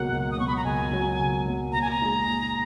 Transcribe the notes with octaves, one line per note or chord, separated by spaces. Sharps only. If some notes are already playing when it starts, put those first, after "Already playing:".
Already playing: C#2 B2 F#3 A#3 F#5
C#2
D#6
B2 F#3 A#3 C#6
B5
A#5
C#2 G#5
B2 F#3 A#3
C#2
B2 F#3 A#3
A#2 A#5
G#5
A#5
G#3 D#4 G#4
A#2